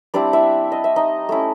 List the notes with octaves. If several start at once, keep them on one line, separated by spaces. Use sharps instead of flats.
G3 C4 D4 E4 D5
E4 E5
D#5
E5
D#4 D#5
A3 C#4 E4